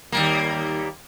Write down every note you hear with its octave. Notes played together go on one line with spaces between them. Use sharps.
D#2 G3 A#3